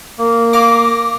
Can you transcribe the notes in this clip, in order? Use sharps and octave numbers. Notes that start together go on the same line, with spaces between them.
A#3
F5 A#5 D6